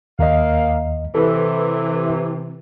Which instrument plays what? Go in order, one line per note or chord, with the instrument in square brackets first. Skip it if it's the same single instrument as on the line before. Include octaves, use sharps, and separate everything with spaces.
[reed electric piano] D#2 D#5 [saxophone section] A#3 F5
[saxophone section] C3 E3 [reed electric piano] A4 B4